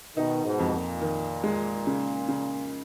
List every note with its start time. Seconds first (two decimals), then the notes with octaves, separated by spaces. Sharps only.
0.16 B2 D#3 D#4
0.45 G#2 B2
0.59 F2
0.73 A#2
1.01 D#3
1.44 G#3
1.87 C#3
2.29 C#3